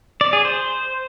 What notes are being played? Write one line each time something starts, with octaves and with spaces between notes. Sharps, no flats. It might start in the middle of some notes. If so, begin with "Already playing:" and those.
D5
G#4
C5